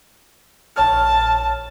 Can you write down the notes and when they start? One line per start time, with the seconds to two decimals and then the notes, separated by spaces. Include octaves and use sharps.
0.76 A#1 C#5 A5 F6